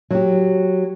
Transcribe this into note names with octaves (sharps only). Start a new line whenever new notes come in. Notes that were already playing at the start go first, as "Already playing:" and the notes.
F#3 G4